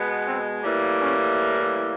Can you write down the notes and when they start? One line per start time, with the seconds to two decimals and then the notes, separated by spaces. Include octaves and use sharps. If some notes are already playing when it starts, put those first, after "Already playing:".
Already playing: B2 G#3 B3
0.25 C4
0.63 A2 E3 G3 A#3
1.01 C#4